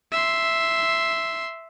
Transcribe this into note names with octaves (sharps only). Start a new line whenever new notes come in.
E5 C6